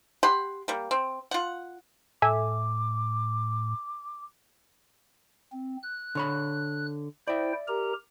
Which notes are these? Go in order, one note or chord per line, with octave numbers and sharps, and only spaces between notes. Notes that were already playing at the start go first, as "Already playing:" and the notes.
G4 F#5 B5 C6
G3 A#3
C4
F4 F#5
A2 A4 E5 G#5 D6
C4
F#6
D3 C#5 B5
E4 C5 D5 E5 G5
G4 A#4 A#5